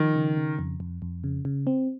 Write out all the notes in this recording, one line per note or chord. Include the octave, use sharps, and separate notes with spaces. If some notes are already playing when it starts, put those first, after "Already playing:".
Already playing: D#3 F3
C#3
C#3
F2
F2
F2
C#3
C#3
C4